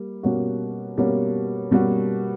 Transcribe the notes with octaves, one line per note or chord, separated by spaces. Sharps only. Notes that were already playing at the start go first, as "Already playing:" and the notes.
Already playing: G3 A#3
B2 G3 A#3 C#4 F#4
B2 G3 A#3 C#4 F#4
B2 G3 A#3 C#4 F#4